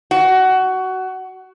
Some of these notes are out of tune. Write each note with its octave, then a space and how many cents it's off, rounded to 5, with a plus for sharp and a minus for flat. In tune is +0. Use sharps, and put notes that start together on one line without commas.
F#4 +20